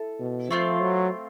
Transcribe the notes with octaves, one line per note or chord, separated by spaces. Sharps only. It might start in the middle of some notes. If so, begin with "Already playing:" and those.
Already playing: E4 A4
B2
F3 A3 C4 F4
F#3